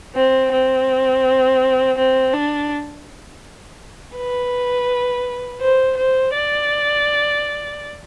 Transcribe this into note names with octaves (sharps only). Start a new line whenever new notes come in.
C4
C4
C4
D4
B4
C5
C5
D5